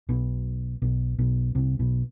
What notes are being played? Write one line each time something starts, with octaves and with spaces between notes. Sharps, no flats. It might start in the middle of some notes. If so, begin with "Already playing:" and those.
B1 B2
B1 B2
B1 B2
C2 C3
B1 B2